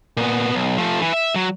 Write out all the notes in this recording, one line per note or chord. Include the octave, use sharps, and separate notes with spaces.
A#2 B3
B1
F3 A3
E3
E5
F#3